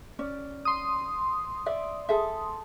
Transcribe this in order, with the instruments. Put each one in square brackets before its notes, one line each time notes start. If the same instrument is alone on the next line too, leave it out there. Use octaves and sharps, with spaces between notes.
[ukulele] C#4 D5
[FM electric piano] C6 D#6
[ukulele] D5 E5
G#4 A4 E5